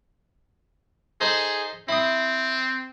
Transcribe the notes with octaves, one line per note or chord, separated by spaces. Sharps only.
D#4 G#4 A4 C5
C4 E4 D#6